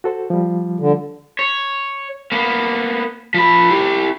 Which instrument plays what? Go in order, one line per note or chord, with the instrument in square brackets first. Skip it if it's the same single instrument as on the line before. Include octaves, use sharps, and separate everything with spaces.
[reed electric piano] F#4 A4 C5
F3 G3
[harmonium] D3
[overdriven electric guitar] C#5
A#3 B3
F3 B5
E4 G4